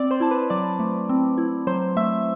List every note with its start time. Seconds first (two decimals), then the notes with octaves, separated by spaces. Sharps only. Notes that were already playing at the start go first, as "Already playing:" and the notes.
Already playing: C4 D5 D6
0.11 C5 C6
0.20 E4 A5
0.31 B4 B5
0.50 F#3 D5 D6
0.79 A3
1.09 C4
1.38 E4
1.67 F#3 C5 C6
1.97 A3 E5 E6